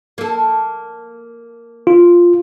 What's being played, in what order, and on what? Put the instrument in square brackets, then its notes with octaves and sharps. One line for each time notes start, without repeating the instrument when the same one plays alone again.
[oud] A#3 A4
[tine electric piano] F4